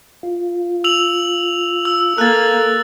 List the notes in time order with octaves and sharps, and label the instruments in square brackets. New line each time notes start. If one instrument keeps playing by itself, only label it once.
[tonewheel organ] F4
[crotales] E6 F7 F#7
E6
[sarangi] A#3 [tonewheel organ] A4 [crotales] F#6 A6